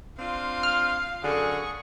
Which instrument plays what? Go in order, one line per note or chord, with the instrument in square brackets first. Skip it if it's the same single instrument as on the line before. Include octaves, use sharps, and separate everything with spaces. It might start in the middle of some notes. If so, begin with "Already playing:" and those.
[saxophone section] C4 D4 F4 [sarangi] F5
[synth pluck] F6
[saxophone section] F#2 D3 [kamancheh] G#4 C#6